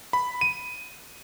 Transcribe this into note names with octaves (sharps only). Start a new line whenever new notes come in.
B5
D#7